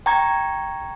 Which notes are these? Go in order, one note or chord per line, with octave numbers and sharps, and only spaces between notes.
G5 A#5 C#6 G#6